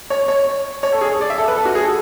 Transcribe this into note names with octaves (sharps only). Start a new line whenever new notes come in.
C#5
C#5
C#5
A4
G#4
D5
E5
A4
B4
A4
F#4
G#4
A4